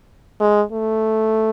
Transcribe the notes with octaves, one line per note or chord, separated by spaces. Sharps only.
G#3
A3